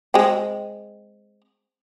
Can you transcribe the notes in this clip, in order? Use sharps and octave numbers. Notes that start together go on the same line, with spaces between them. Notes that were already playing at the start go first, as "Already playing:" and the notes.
G#3 C4